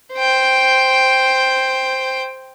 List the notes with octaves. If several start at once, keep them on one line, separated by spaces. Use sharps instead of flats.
C5 G5